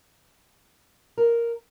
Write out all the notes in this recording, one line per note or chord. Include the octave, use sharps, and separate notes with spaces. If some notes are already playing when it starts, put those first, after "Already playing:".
A#4